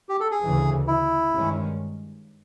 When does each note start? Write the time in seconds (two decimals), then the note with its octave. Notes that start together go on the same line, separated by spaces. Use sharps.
0.09 G4
0.20 A4
0.31 G#4
0.42 D2 C#3 E3
0.87 E4
1.31 G2 D#3 G#3 C#4